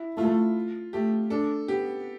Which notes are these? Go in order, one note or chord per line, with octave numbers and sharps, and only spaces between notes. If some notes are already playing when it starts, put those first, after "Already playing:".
Already playing: E4
A3 F4
A3 G4
D4 A4
B3 G4